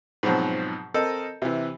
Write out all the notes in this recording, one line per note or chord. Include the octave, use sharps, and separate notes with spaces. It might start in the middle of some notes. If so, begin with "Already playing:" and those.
G#2 B2 F3 F#3 C4
C4 A4 A#4 D#5
C3 E3